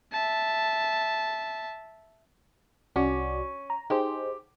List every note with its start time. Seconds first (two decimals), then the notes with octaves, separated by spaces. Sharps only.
0.12 E5 A5
2.96 C2 C#4 F#4 D5
3.70 A#5
3.90 D#4 G4 G#4 C5